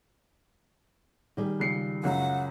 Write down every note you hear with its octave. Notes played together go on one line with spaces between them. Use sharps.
D#3 G3 G#4
C#2 C7 C#7
C#2 F#2 F#5